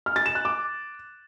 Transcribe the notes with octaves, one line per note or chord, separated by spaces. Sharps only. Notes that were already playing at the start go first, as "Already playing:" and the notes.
F6
A6
E7
F#6
D6